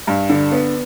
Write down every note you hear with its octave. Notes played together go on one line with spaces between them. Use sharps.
G2
D3
B3